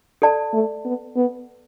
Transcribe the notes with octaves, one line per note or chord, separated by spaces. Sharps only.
A4 D5 A5
A3
B3
B3